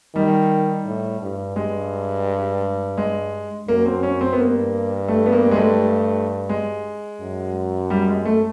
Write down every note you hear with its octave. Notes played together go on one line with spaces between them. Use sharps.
D#3 G3
A2
G2
G2 G#3
G#3
F#2 A#3
C4
C#4
C4
B3
G2 A#3
A3
B3
A#3
G#3
A3
G#3
F#2
G3
G#3
A3